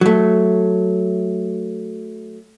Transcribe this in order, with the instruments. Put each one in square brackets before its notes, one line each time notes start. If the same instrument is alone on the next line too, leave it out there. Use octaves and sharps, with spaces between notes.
[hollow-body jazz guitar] F#3 A3